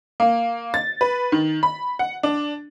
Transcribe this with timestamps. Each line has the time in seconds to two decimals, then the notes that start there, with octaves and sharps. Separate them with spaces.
0.20 A#3
0.74 A6
1.01 B4
1.32 D#3
1.63 B5
1.99 F#5
2.23 D4